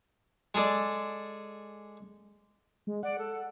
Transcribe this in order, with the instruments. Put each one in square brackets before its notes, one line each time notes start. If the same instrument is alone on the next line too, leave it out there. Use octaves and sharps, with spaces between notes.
[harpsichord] G#3 G#4 A4 D5
[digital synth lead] G#3
[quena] D5 [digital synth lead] F#5
[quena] A4